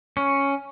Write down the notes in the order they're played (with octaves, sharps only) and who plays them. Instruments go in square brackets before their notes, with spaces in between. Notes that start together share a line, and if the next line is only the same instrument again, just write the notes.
[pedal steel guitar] C#4